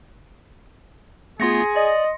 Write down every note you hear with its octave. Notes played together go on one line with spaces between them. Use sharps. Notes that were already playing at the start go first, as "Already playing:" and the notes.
A3 B3 F4 G#4 C6 A#6 C#7
D5 D#5